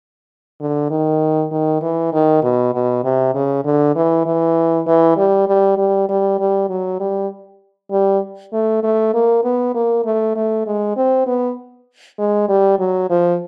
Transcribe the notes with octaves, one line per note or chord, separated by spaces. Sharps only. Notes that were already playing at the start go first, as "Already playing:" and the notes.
D3
D#3
D#3
E3
D#3
B2
B2
C3
C#3
D3
E3
E3
E3
G3
G3
G3
G3
G3
F#3
G3
G3
A3
A3
A#3
B3
A#3
A3
A3
G#3
C4
B3
G#3
G3
F#3
F3